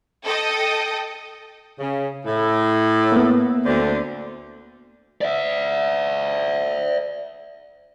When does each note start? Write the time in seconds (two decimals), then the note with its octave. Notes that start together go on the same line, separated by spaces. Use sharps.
0.25 A4 D#5 G5 D#6
1.79 C#3
2.26 A2
3.12 A#3 B3
3.65 D2 D3 C4
5.21 D5 E5